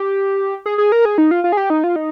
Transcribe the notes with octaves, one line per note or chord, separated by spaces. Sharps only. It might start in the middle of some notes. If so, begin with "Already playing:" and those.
Already playing: G4
G#4
G#4
A#4
G#4
D#4
F4
F4
G#4
G4
D#4
F4
D#4